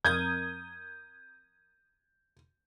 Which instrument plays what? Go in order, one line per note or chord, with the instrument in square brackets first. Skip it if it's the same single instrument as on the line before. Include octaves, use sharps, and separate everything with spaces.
[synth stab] F2 A#4 D#6 [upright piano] G6 G#6